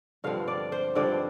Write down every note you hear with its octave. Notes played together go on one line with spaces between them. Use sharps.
G2 D3 F3 C4 F5
D5
C5
G2 D3 F3 C4 D5